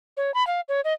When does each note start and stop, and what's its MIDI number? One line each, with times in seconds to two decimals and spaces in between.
0.17 0.34 73
0.34 0.45 83
0.47 0.61 77
0.69 0.81 73
0.84 0.93 75